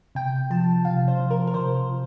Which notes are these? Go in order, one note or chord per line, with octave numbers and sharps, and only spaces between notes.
C3 G5
F3 A5
C3 F5
C5
F3
A#4
A#4
C3 C5
F3